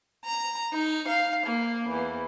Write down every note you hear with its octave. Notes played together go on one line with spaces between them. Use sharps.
A#5
D#4
F5
A#3
E2